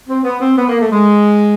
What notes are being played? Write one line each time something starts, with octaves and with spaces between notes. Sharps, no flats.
C4
B3
C4
B3
A#3
A3
G#3